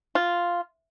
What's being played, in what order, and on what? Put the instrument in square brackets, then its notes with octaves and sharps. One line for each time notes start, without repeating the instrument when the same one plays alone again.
[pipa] F4